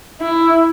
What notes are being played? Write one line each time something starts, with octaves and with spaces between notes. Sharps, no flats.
E4